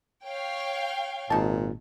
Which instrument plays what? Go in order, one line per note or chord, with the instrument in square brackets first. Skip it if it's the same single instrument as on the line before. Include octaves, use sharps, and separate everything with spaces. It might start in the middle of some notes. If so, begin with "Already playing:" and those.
[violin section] C#5 F5 G5
[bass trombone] G#1 [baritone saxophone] A#2 [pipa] D#4 A5